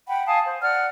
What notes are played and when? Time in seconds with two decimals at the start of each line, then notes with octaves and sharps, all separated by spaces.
0.07 F#5 G5 B5
0.26 F5 G#5 A5 D#6
0.44 C5
0.61 D5 F#5 F6